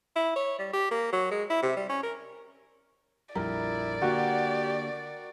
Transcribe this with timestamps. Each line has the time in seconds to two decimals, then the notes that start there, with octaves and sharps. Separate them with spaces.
0.16 E4
0.36 C#5
0.59 G3
0.73 G4
0.91 A#3
1.13 F#3
1.31 G#3
1.50 E4
1.62 C3
1.77 G3
1.89 C#4
2.03 A#4
3.35 A#1 F2 G3 E4 A#4 D5
4.02 D3 A#3 F#4 G4